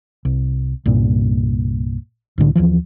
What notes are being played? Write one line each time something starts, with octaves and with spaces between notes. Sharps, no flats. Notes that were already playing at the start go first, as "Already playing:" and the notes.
C2
C2 G2 A#2
C2 A2 D3
D#2 C#3 E3 F3